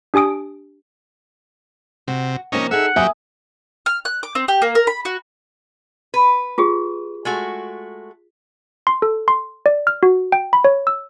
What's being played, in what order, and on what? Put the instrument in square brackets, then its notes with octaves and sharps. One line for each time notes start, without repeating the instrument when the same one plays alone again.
[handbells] D4 G4 G#5 D#6 D7
[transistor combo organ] C3 [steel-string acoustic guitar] F#4
[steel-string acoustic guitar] C3 F3 A#3 [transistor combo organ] C#4 D#4
[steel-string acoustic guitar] D#4 G#4 A4 [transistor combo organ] E5 [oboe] F#5
[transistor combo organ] F#3 G4 [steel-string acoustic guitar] B4 [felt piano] E5 G#5 D#6
[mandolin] F6
F#6
D6
C4
G4
A#3
A#4
B5
F#4
[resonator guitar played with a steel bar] B4
[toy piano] F4 G4 G#4
[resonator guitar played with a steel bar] G#3 A3 F#4
[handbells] C6
A4
C6
D5
F6
F#4
G5
B5
C#5
E6